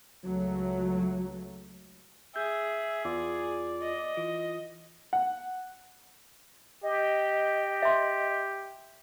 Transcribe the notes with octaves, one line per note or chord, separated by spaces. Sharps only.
C#2 F#3 A3
G#4 E5 G6
E2 F4 D5
D#5
E3 F4
F#5
G4 D#5
E5 C6